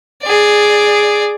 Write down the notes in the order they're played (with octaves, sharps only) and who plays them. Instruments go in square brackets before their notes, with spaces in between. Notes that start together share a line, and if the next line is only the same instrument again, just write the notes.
[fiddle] G#4 D5